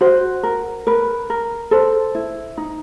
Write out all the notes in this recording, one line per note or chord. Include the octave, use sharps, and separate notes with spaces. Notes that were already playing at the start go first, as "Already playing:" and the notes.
F#4 C5
A#4
A#4 B4
A#4
A4 C5
E4
D#4